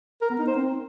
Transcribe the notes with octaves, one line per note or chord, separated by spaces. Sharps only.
A#4
B3
D#4
C5
C4